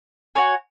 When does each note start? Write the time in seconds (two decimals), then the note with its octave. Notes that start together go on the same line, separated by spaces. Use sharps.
0.35 F#4 C#5 G#5